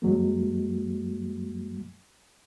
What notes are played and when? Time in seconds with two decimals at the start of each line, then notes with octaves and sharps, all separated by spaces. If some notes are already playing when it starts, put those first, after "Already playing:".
0.02 F#2 F#3 G#3 A#3